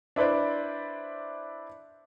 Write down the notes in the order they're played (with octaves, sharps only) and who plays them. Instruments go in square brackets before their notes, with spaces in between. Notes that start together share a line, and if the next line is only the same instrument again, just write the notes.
[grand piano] D4 E4 B4 C5 D5